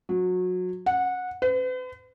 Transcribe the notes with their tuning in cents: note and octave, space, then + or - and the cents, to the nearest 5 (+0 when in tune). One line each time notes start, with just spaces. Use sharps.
F#3 -25
F#5 -15
B4 +45